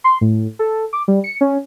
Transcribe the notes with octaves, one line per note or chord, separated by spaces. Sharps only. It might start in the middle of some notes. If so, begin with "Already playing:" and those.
C6
A2
A4
D6
G3
C#7
C#4